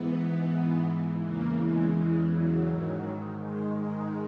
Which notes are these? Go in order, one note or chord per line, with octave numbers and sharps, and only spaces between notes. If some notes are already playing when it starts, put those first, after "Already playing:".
Already playing: G#2 E3 B3
E2 C#3 E3 A#3
G#3
G#3
F#3
G#2 D#3
G#3
G#3